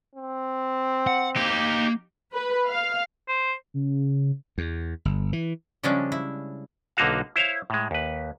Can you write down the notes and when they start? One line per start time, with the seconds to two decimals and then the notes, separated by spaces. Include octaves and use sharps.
0.15 C4
1.07 F#5
1.36 A#3 D#4 G4
2.33 B4
2.68 F5
3.28 C5
3.74 C#3
4.58 E2
5.05 G1
5.33 E3
5.83 C#3 F3 G3 G#3 C#4 D4
6.12 E4
6.97 B1 D3 A#3 D#4 F#4 F5
7.36 E4 C5 C#5 F5
7.70 A2 G#3
7.91 D#2 B4